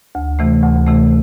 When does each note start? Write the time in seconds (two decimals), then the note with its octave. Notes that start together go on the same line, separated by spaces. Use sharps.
0.15 D2
0.39 C3 E3 A3
0.63 D2
0.87 C3 E3 A3